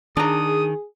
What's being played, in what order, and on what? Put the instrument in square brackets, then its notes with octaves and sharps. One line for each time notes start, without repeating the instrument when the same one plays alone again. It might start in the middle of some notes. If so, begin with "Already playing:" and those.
[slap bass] D#3 [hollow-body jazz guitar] D4 A#5 [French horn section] G#4 [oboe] D#6